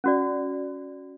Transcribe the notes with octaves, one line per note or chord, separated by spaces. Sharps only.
C#4 F#4 D5